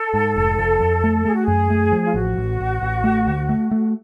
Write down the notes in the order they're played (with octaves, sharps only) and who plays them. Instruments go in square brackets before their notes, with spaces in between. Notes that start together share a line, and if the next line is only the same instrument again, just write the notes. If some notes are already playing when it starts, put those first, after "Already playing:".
Already playing: [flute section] A4
[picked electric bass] G#2
F1
F2
F2
A3
[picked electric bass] A3 [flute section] G#4
[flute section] F#4
G#4
[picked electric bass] F#2
A3
F3
[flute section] F4
[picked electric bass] A1 [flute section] F#4
[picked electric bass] A1
A1
A1
A3
D2
A3
A3